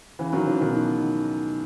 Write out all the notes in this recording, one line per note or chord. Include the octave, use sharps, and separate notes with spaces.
C#3 E3
D#3 F#3
C#3 E3
B2 D#3